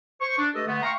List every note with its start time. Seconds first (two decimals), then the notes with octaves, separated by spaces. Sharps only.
0.21 C5 C#6
0.38 D4
0.55 A3 G4 A4 B4 D#5
0.67 D3 A3 B3
0.83 E5 F5 G5 A#5 C6 C#6